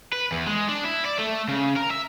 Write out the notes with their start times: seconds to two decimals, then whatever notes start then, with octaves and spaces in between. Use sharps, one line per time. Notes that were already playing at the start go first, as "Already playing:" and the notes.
0.12 B4
0.32 E2
0.47 G#3
0.68 D4
0.84 E4
1.05 D5
1.18 A3
1.48 C#3
1.76 A#4
1.90 E5